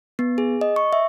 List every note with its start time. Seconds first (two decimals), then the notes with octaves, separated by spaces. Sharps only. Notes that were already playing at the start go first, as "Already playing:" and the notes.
0.19 B3
0.38 G#4
0.61 D#5
0.76 C#6
0.93 E5